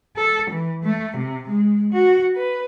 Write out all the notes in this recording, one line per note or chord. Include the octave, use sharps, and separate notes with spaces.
A4
E3
A3
C3
G#3
F#4
B4